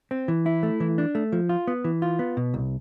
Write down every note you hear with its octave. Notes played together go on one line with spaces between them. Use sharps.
C4
E3
E4
A3
E3
D4
A3
F3
F4
B3
E3
F4
B3
B2
C2